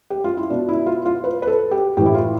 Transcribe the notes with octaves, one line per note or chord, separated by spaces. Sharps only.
G4
F4
E4
B2 D4
E4
F4
F4
B4
B4
A4
G4
A2 E3 G4
E4
F4